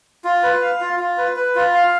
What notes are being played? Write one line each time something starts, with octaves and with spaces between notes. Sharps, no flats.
F4
B4
F5
F4
F4
B4
B4
F4
F5